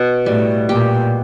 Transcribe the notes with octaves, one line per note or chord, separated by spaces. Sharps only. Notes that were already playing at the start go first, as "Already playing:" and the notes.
Already playing: B2
A2 G3
A#2 G4